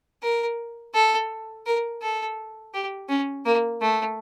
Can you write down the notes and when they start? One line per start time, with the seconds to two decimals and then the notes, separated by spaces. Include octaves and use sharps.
0.23 A#4
0.94 A4
1.66 A#4
2.02 A4
2.74 G4
3.09 C#4
3.45 A#3
3.81 A3